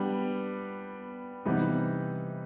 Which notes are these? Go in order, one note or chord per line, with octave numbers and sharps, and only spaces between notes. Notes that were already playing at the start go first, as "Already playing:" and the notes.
Already playing: G3 B3 D4 G4
C3 E3 G3 B3 D#4